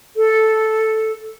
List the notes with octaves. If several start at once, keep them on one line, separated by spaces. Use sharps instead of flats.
A4